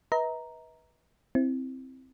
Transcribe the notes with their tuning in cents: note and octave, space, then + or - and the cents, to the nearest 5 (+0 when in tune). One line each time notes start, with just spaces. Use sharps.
B4 -20 D#5 +45 A#5 +0
C4 +0 E4 +0